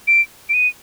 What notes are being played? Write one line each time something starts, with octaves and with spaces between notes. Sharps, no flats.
D7
D7
D#7